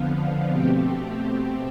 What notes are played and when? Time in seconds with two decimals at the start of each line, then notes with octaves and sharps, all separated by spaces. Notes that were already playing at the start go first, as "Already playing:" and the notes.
Already playing: F2 D3 F3 B3 F4
0.51 B2 A3 C4 G4